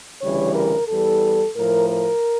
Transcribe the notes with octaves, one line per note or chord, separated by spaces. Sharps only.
D2 C#3 E3 G3 C#5
A#4
E2 E3 G3 A4
A2 F3 A#4
A#4